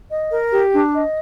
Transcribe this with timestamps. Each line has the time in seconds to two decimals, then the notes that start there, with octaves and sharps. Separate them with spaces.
0.10 D#5
0.30 A#4
0.52 G4
0.73 D4
0.93 D#5